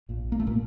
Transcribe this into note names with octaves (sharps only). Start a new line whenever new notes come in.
A#1 A#2
A#3
A3
A#2 A#3